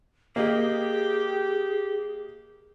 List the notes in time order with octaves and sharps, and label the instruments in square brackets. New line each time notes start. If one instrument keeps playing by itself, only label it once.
[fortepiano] A#3 D#5 [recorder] G4 [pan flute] G#4